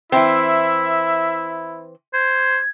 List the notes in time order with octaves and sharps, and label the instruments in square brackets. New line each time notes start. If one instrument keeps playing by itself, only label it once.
[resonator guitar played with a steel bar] E3 C4 [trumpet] E4 [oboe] E5
[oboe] C5 [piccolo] G#6